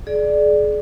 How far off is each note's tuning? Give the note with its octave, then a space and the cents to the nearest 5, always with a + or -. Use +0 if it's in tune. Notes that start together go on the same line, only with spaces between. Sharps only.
G#4 +35 D5 +10